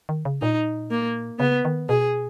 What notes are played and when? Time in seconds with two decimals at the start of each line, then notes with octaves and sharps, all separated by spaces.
0.09 D#3
0.25 C#3
0.42 A#2 D#4
0.91 A#3
1.39 C#3 B3
1.65 D#3
1.89 B2 G#4